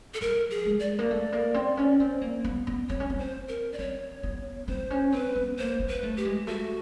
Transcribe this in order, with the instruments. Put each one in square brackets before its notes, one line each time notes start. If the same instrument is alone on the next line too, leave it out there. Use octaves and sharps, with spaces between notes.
[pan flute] A4
[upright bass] F#3 [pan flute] A#4
[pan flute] G#4
[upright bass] G#3
[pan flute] D5
[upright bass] A#3
A3
A#3
C4
C#4
C4
A#3
B3
B3
[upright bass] C4 [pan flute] C#5
[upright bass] C#4
C4
[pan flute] C5
A#4
D5
[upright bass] C4 [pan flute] C#5
[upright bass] B3
[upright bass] C4 [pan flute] C5
[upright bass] C#4
[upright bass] C4 [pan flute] B4
[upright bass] B3
[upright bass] A#3 [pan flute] C5
[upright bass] B3
[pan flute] B4
[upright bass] A3
[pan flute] G4
[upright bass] G#3
[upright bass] A3 [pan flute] F#4